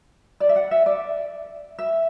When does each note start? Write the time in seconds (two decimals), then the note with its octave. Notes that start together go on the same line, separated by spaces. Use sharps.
0.40 D5
0.49 E5
0.56 F#5
0.71 E5
0.86 D5
1.79 E5